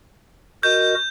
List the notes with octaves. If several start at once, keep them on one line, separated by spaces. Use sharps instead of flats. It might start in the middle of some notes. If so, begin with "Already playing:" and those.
F#4 A#4 D#5 G6